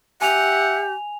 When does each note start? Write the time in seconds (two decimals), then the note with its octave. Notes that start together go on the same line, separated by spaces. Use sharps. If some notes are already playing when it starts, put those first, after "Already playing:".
0.22 G4 E5 F#5 G#5 F7